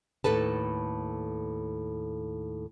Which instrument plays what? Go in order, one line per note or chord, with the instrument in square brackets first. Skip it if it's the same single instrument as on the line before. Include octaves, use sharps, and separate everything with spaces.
[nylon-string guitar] D#2 A2 A4 B4 A5